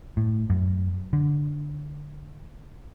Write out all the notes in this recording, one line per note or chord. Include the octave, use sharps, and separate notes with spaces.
A2
F#2
D3